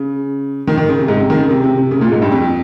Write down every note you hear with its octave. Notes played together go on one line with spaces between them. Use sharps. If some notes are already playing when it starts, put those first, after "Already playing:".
Already playing: C#3
D#3
D#3
C#3
C3
G#2
C3
D#3
C#3
C3
C3
C3
C#3
A#2
G#2
G2
F2